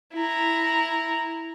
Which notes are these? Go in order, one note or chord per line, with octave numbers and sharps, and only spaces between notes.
E4 A#5